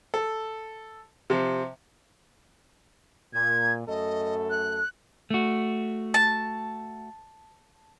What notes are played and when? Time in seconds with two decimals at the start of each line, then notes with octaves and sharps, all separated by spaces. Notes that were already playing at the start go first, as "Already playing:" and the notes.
0.14 A4
1.30 C3 F3
3.33 A#2 G#6
3.87 F#2 A3 A4 D#5
4.50 F#6
5.31 A3 F#4
6.14 A5